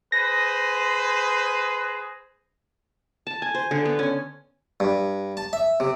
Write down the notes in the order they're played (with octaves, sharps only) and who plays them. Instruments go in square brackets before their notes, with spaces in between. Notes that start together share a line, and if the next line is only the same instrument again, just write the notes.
[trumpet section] G#4 B4 C5 [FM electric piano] A#6
[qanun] A5
G#5
C5
D3
B3
C#4
[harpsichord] G2
A5
E5
C3